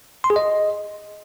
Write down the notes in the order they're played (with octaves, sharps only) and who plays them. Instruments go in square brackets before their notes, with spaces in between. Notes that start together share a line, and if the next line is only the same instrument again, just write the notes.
[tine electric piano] C6
G#4
D#5